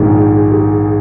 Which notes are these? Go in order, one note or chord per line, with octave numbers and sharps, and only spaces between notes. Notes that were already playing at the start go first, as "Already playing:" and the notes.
Already playing: A#1 G#2 D#3 G#4
G4
G#4